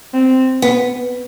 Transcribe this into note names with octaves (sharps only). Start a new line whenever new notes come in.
C4
B3